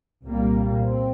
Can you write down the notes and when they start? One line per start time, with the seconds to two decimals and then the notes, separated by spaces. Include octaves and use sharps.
0.25 C2 A#2 G3 A#3
0.84 C4